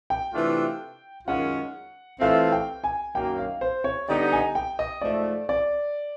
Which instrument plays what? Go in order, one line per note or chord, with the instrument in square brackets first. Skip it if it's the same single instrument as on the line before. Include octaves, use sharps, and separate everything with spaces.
[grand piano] G5
[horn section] C3 E3 A3 D4 F4
[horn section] F#2 D#3 G#3 C#4 F4 [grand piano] F#5
[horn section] E3 A3 C4 F4 A4 [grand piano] F5
[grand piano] G5
G#5
[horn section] F#2 D#3 F#3 A#3 [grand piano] G5
[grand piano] F5
C5
C#5
[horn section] D3 G3 B3 D#4 [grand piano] D5
[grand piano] G#5
G5
D#5
[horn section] G#2 F3 A3 [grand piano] D5
[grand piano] D5